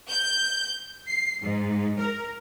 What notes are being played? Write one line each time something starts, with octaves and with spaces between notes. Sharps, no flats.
G6
C7
G#2
A#4